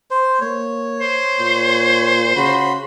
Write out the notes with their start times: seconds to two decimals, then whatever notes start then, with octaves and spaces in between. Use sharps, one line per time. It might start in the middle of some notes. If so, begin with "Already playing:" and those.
0.11 C5
0.41 A#3 C#5
1.01 C5
1.39 A#2
2.36 C#3 F#4 B5 C6